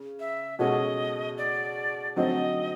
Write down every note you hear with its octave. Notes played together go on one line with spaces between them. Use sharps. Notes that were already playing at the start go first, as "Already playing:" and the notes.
Already playing: C#3
E5
B2 G#3 C#4 F#4 A4 D#5
D5
D3 F#3 A3 C4 D#4 D#5